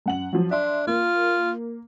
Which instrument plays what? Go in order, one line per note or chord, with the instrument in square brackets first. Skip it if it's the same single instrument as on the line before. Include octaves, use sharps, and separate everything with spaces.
[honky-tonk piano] F#2 F#5 F#7
F3 F#3
[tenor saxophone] D4 [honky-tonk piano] E5 C6
[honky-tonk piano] A#3 [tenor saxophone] F4